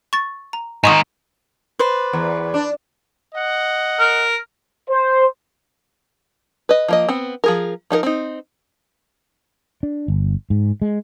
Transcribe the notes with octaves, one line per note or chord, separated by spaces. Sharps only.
C#6 A6
A#5
G#2 D#3 D#5 C#6 D#6
B4 C5 D5
E2
D4
D#5 F#5
A#4
C5
B4 D#5
F3 A#3 D#5
B3 C4
F3 G#4 A#4
F3 D#4 A4 A#4
C4 D#4
D4
G1
G#2
G#3